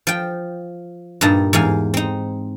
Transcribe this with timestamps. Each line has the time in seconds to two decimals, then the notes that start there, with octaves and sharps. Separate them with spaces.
0.07 F3 G5
1.21 G2 A#2 D#4 A5
1.53 E2 G#2 F5 G#5
1.94 C4 D#4